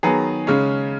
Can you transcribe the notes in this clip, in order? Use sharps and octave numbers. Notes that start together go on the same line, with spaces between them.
D#3 F#3 B3 G#4
C#3 G#3 C#4